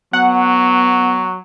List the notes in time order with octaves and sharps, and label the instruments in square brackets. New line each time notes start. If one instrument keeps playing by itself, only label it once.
[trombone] F#3 [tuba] B3 [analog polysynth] F#5